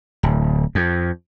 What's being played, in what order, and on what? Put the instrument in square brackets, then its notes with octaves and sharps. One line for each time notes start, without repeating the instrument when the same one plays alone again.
[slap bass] D1
F2